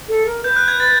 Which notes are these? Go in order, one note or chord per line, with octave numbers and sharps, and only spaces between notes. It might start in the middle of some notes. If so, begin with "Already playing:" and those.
A4
A#4
B4 G6
F#6
G#6
A6